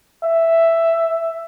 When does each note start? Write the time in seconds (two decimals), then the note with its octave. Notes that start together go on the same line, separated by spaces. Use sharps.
0.23 E5